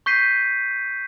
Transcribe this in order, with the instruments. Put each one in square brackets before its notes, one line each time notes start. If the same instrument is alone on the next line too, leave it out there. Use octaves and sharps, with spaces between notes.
[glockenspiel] C#6 G6 B6 C7 D#7